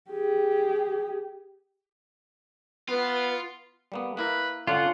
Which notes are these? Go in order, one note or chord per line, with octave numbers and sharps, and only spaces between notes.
G4 G#4
B3 F4 B4
G3 A#3 B3
A#3 E4 A#4 B4
D3 C#4 D4 F4 F#5